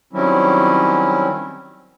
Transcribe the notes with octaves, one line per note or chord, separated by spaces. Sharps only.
D#3 F#3 G3 C4 C#4 E4